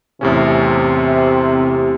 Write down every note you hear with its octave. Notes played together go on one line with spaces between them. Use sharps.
E2 A2 C3 C#4